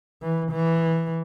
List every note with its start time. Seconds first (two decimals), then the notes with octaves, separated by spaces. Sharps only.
0.23 E3
0.51 E3